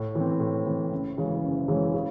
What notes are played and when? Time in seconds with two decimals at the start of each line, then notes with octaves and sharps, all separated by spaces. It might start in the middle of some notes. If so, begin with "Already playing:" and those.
Already playing: A2
0.15 E3 C4
0.40 A2
0.66 E3 C4
0.92 F#1
1.17 F#2 C#3 E3 G#3
1.43 F#1
1.68 F#2 C#3 E3 G#3
1.94 C#3